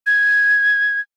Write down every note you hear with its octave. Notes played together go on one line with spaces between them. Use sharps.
G#6